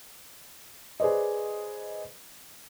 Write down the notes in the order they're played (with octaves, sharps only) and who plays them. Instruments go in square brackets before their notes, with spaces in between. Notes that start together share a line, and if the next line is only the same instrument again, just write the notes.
[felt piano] G#4 B4 C5 D5 D#5